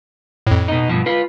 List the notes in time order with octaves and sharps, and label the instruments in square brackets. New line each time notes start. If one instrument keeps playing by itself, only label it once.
[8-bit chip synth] F2 A2
[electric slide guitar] B2 D#4
G2 B2 F3
F4 B4